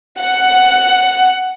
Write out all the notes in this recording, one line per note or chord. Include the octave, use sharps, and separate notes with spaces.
F#5